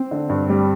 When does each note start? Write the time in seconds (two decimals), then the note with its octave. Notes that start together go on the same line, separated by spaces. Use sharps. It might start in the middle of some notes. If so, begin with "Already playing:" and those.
Already playing: C4
0.11 D3
0.30 G2
0.49 G3